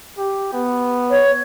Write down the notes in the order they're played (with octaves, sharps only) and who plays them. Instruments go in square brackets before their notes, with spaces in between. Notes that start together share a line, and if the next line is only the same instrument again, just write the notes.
[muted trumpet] G4
B3
[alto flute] C#5